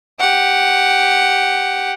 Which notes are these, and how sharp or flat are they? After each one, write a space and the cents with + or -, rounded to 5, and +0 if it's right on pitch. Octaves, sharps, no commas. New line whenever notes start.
G4 +0 F#5 +0